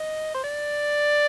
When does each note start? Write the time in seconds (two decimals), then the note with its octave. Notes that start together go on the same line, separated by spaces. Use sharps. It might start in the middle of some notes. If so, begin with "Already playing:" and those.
Already playing: D#5
0.34 C5
0.44 D5